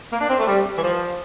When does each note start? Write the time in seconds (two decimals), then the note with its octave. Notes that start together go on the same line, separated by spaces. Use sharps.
0.12 A#3
0.20 D4
0.29 C4
0.38 A3
0.47 G3
0.76 E3
0.82 F3